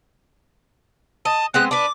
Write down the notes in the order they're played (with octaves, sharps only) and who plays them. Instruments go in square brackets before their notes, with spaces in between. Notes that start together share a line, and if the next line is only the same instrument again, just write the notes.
[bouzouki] D#5 [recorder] A5
[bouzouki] G#3 B3 C4 [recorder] F#6
[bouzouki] D4 B4 [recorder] D6